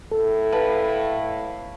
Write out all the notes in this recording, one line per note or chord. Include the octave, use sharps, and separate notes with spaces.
A2 A4
B4 F5 A5